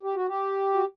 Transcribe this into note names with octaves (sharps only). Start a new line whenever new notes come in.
G4
F#4
G4
F#4